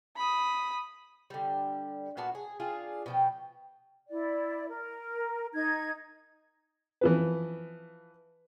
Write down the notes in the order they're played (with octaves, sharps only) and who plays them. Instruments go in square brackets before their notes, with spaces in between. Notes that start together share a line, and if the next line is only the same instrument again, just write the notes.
[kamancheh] B5 D#6
[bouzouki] D3 G3
A#2 B3 F#4 A5
G#4
D4 F4 G#4
B2 F3 G5
[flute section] E4 D5
A#4
D#4 G#6
[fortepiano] E3 F3 B4